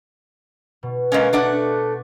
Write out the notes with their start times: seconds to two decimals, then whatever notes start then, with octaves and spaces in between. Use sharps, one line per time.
0.83 B2
1.12 G#3 A#3 C#4
1.33 A3 D4 F#5